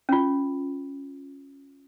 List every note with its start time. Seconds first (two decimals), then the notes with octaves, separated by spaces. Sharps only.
0.09 C#4 F4